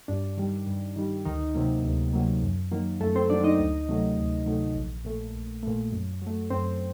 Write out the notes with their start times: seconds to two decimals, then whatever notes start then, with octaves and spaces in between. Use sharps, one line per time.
0.08 G2 D4
0.37 D#3 G3
0.67 G2
0.96 D#3 G3
1.25 D2 D#3 D#4
1.55 C3 F#3 A#3
1.84 D2
2.13 C3 F#3 A#3
2.43 F#2
2.72 D#3 F#3 A#3
3.01 F#2 A3 A4
3.15 C4 C5
3.30 D#3 F#3 A#3 D4 D5
3.44 D#4 D#5
3.59 D2
3.89 C3 D#3 F#3 A3
4.17 D2
4.46 C3 D#3 F#3 A3
4.75 A#1
5.04 A#2 A3
5.34 A#1
5.63 A#2 A3
5.92 F#2
6.22 F#3 A3
6.50 F#2 C4 C5